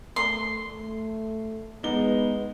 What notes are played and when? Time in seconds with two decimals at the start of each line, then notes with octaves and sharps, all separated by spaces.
0.16 A3 C6
0.73 A3
1.83 G#3 B3 D#4 G7